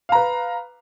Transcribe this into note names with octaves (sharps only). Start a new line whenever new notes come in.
B4 F5 A#5